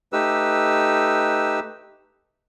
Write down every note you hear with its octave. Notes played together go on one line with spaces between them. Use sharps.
A3 D#4 G4 B4 E6